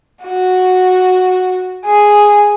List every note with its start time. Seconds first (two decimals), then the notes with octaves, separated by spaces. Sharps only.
0.23 F#4
1.85 G#4